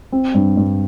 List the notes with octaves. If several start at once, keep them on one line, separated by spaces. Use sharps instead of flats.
C4
G2
G2